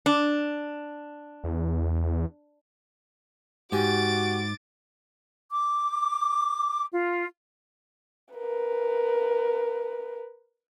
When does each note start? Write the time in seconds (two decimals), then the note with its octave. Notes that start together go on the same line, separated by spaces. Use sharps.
0.06 D4
1.44 E2
3.72 G#2 F#4 G4 G#5 D6 A6
5.50 D6
6.93 F4
8.35 A#4 B4